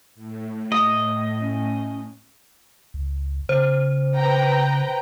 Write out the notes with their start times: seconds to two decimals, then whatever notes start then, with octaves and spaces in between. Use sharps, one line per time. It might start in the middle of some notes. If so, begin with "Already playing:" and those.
0.15 A2
0.72 D#5 D#6
1.41 C#4
2.94 C#2
3.49 C#3 C5
4.15 B4 G5 A#5